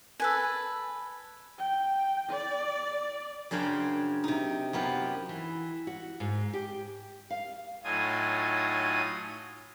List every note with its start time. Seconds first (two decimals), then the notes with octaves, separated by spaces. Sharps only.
0.20 A4 B4 G#5
1.59 G5
2.29 D5
3.51 F#2 C#3 D4 C5 F5 G5
4.24 C3 D#4
4.73 F#2 B3 F4 G4
5.29 E3
5.87 F#4
6.20 G#2
6.53 G4
7.30 F5
7.84 A2 F#3 D#4 F4 G#5 D#6